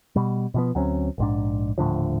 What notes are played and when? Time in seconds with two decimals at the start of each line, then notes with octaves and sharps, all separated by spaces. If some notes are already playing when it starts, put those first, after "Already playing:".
0.16 B2 G3
0.54 B2 F3 B3
0.75 D2 F#3 C4 C#4
1.18 A#1 G#2 D4
1.78 D#1 A2 D3 F3